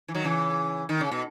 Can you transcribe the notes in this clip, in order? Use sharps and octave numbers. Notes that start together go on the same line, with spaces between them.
E3
D#3 F#3
C#3 E3
D#3
C#3
B2